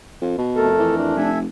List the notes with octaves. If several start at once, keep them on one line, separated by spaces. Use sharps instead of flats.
F2
B2
F2 A3 A4 A#4
E3
D4
F1 A4 E5 G#5